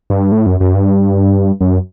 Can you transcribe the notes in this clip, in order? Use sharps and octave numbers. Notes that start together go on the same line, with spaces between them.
G2
A2
F#2
F#2
G2
F#2